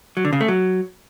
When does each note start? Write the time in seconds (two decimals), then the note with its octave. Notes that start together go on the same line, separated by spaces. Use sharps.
0.17 F#3
0.25 D3
0.33 C#3
0.40 A3
0.48 F#3